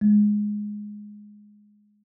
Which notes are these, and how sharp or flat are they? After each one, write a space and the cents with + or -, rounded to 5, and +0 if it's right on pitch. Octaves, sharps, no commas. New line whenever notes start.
G#3 +5